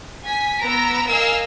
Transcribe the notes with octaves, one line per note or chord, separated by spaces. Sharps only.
G#5 B6
B3 A#5 E6 A#6 D7
A#4 D#5 F5 G#5 E6 F6